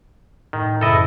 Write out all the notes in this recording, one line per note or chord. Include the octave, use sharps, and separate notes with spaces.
A2 D#3
F#1 E4 A4 D#5 E6 F6